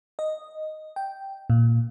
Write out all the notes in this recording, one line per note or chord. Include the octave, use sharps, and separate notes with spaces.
D#5
G5
A#2